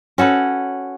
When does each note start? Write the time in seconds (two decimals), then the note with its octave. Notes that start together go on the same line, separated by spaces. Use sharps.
0.18 C#4 F#4 A4 B4